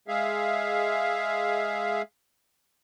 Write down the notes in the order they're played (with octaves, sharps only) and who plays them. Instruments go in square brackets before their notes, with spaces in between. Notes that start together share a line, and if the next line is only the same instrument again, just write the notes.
[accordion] G#3 G#4 E5 F5